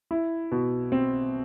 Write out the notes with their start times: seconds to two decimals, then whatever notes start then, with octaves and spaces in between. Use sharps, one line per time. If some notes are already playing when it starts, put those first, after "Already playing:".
0.11 E4
0.51 B2
0.92 C4